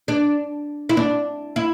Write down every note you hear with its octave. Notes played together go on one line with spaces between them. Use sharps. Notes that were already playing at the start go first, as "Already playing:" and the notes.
D4
E4
D4
E4